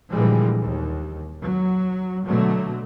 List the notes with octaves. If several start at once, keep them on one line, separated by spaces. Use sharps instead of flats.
A#2 D3 E3 F3 G3 G#3
D#2
F#3
B2 D3 F#3 A3